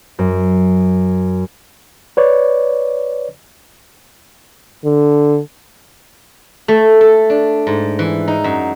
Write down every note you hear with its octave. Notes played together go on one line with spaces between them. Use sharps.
F#2
B4 C#5 D5
D3
A3
A4
D4
G#2
E3
D#4
F#2